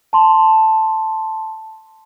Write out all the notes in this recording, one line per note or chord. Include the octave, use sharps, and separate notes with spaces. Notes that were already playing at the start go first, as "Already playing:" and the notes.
A5 C6